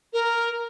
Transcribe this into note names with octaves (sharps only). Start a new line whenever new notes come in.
A#4